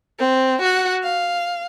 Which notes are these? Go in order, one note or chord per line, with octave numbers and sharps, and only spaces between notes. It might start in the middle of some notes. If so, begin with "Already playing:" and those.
C4
F#4 F#5
F5